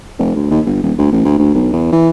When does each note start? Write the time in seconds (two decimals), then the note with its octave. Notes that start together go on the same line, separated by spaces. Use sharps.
0.19 F1
0.36 D2
0.50 D#2
0.66 G1
0.83 D#1
0.98 D2
1.12 A1
1.25 D2
1.38 D2
1.54 B1
1.73 E2
1.93 E3